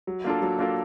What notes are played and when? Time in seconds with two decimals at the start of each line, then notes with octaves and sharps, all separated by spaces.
0.07 F#3
0.24 A#3 D4 F4 A4
0.42 F#3
0.59 A#3 D4 F4 A4